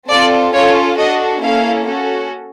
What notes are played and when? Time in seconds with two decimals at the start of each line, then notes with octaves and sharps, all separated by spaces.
0.10 C4 F4 A4 D5
0.54 C#4 F4 A4 C#5
0.99 D4 F#4 A4 D#5
1.43 A#3 C#4 E4 A4 F5
1.86 C#4 F#4 A4